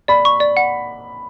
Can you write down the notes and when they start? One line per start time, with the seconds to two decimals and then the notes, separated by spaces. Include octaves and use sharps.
0.08 D5 B5
0.25 C#6
0.40 D5
0.57 F#5